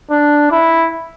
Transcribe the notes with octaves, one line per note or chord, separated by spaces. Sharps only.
D4
E4